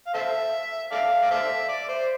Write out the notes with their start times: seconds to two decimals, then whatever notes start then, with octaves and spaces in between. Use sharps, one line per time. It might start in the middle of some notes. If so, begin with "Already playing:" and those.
0.07 F5
0.14 A4 C5 E5
0.92 A4 D5 F5
1.23 D5
1.31 A4 C5 E5
1.69 D5
1.88 C5